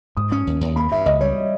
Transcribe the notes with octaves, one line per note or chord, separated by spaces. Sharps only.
G#2 D#6
C#4 D#6
D#2
D#2
A#3 B5
G2 E5
C#2 D#5
G3 C#5